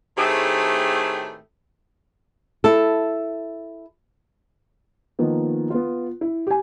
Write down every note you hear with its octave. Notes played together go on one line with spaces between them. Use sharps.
A2 D#3 A3 C4 G4 G#4
E4 A4
D#3 F3 A#3 B3
B3 F4
E4
G4 G#5